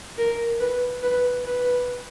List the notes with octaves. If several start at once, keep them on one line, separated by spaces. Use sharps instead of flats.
A#4
B4
B4
B4